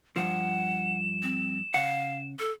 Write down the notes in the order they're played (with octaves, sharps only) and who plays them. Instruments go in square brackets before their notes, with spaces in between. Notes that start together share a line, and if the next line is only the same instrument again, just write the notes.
[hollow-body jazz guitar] G2 F3 [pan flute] F#5 [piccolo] E7
[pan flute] C4
[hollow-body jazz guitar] C#3 F#5 [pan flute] F5
[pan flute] A4